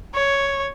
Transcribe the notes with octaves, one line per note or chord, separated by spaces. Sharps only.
C#5